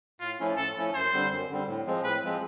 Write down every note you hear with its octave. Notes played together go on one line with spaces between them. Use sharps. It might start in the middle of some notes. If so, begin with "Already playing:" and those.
A2 F4
F3 A3 C#4 E4
A2 A4
F3 A3 C#4 E4
F#2 C5
D3 G3 C4
F#2
D3 G3 C4
A2
F3 G#3 C4
A2 B4
F3 G#3 C4